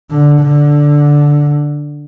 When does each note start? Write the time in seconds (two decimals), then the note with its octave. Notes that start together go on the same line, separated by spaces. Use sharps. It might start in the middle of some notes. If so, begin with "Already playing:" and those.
0.10 D3
0.40 D3